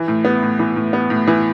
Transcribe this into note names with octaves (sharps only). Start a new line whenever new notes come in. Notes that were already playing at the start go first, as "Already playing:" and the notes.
Already playing: E3
A2
B3
A2
E3
A2
B3
A2
E3